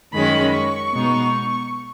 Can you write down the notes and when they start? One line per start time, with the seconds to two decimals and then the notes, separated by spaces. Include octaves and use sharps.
0.13 F#2 D#3 G#3 C#4 B5
0.53 C#6
0.92 B2 G#3 B3 D#4